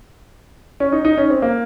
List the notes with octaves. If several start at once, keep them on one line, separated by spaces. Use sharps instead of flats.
C#4
D#4
D#4
C#4
C4
A#3